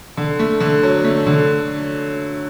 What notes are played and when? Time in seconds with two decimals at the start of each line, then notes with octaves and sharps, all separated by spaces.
0.17 D3
0.39 A3
0.60 D3
0.83 F#3
1.04 A3
1.27 D3